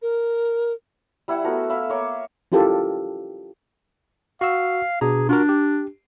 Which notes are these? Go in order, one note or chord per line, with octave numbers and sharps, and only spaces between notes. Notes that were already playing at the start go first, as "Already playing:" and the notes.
A#4
G3 E4 E5 F#5
A3 B3 F#4 A#4
E5 F5 B5
A#3 C#5 D6
C#4 E4 F4 G4 A4 A#4
F#4 F5 E6
B2 D4 G#4 A#5
D4 F4 F#4 A#4
G4